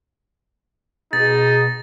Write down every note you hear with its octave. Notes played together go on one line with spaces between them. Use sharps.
B2 D#4 G#4 A6